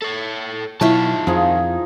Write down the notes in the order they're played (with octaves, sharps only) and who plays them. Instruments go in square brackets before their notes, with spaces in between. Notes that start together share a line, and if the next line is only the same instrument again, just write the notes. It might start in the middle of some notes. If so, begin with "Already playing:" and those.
[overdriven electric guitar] A4 C#5
[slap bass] B2 F#3 [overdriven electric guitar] D#3 A5 [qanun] E4 F4 C#5
[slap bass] F2 [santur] F3 D#4 G#4